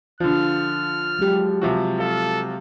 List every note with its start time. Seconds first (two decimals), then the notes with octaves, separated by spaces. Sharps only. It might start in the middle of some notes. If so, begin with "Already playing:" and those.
0.20 D3 F3 F4 F6
1.19 F#3 G#3 G4
1.62 C3 F3 F#4
2.00 A4 F5